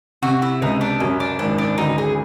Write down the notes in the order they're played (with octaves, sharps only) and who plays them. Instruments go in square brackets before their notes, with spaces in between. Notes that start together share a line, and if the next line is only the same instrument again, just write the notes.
[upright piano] C3 [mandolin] F#4
[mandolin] E4
[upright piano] C#2 [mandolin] D#4
[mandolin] D4
[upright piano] F#2 [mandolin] C#4
[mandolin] D4
[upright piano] G#1 [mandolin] D4
[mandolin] D4
[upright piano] D2 [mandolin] D#4
[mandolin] G#4